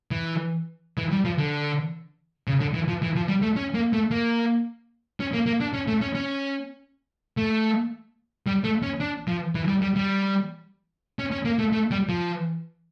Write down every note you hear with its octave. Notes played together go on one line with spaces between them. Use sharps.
E3
E3
G3
F3
D3
C#3
D3
E3
F3
E3
F3
G3
A3
C#4
A#3
A3
A#3
C#4
A#3
A#3
D4
C#4
A3
C#4
C#4
A3
G3
A3
C#4
D4
F3
E3
G3
G3
G3
C#4
C#4
A#3
A3
A3
G3
F3